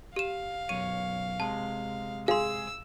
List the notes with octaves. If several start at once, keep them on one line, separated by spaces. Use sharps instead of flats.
G4 F5 E7
B1 F#2 C#5 D#7
C3 G#3 A5
G#4 F5 C6 E6